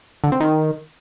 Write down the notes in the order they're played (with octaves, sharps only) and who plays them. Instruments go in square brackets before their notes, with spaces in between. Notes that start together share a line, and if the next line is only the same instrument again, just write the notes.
[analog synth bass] D3
C4
D#3